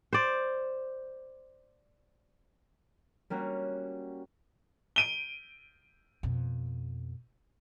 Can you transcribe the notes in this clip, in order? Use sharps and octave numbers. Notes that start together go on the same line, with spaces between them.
C5 D5
G3 A#3 C#4 F#4
D7 D#7 G7
F2 B2